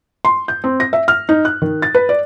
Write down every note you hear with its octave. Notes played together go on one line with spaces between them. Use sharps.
C6
G6
C4
A#6
E5
F6
D#4
F#6
D#3
A6
B4
D5